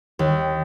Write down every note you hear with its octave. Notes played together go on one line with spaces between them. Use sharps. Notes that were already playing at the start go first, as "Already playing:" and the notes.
D#2